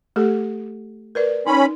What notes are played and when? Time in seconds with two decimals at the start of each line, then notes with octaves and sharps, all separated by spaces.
0.16 A3 G4 A4
1.15 A#4 B4 D5
1.47 C#4 D#4 B5